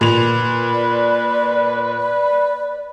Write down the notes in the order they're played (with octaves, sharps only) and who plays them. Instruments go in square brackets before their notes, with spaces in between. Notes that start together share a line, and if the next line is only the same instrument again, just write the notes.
[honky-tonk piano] A#2 F7 [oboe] B4
[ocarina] D5
D5